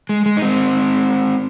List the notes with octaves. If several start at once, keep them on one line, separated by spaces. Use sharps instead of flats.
G#3
G#3
D#4
G#3 C4